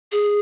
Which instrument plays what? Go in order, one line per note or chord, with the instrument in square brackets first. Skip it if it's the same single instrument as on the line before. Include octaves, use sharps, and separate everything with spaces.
[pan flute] G#4